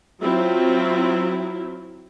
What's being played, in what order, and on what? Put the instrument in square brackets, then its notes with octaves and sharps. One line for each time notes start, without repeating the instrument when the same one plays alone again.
[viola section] F#3 C4 E4 F4